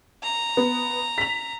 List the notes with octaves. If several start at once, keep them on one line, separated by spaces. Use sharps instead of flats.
A#5
B3
B6 F7